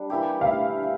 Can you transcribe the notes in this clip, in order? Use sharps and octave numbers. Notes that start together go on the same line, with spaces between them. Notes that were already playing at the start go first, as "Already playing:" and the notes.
Already playing: G3 D4
E3 A#3 E4 G4
F5
E5